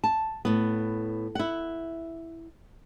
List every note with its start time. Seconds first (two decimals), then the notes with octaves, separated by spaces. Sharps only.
0.04 A5
0.45 A2 B3
1.35 E4 F#5